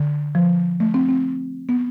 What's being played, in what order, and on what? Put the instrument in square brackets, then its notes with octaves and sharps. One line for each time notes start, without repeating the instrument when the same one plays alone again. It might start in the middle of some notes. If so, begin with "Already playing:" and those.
Already playing: [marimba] D3
F3
A3
C4
C4
B3